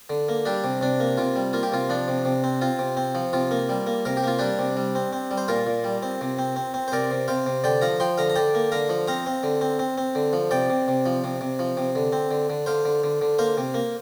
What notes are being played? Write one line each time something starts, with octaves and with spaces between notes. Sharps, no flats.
D3
A#3
G3 D4 G4
C3
C3 D4
A#3
C3 F4
G3
A#3 F4
G4
C3 F4
F3 D4
C3
C3
C4
C4 F4
C3
C4
F3
C3 F4
A#3
G3
A#3
C3 A#4
G4
A#3 F4
G3 D4 G4
C3
G3
C4
C4
G3
C5
A#2 F4 A#4
A#2
G3
C4
C3
C4
C4
C4
C5
C3 A#4 D5
C3
C3 C5 F5
C3
D3 D5 G5
F3 F5 A#5
F3 G5 C6
D3 F5 A#5
A#5
D3 D5 G5
A#3
D3 F5 A#5
F3
C4 F5 A#5
C4
D3
C4
C4
C4
D3
F3
C3 D5 G5
C3
C3
F3
C3
C3
F3
C3
D3
C4
D3
D3
D3 C5 F5
D3
D3
D3
A#3 C5 F5
C3
A#3